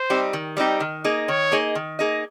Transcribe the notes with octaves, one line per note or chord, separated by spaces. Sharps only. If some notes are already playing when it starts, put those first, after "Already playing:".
Already playing: C5
G3 C4 D#4 G4
D#3
G3 C4 D#4 G4
D#3
A#3 D#4 G#4 D#5
D#3 C#5
A#3 D#4 G#4 D#5
D#3
A#3 D#4 G#4 D#5